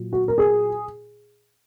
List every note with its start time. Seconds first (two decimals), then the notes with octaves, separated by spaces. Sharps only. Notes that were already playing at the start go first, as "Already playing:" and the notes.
Already playing: A#2 F#3
0.13 F#4
0.28 A#4
0.38 G#4